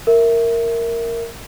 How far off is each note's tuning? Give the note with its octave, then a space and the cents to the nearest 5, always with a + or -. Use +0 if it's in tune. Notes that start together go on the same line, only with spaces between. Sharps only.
A#4 -10 E5 +0